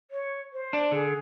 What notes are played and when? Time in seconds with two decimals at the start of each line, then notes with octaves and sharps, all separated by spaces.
0.11 C#5
0.53 C5
0.73 D4 D5
0.91 D3 G#4